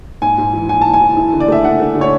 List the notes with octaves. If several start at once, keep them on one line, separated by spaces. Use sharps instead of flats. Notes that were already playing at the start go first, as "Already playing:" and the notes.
G#2 G#5
G#2
E3
E3 G#5
E3 A5
G#5
E3
E4
D3
D5
A3 E5
D3 F#5
A3
D3
C#5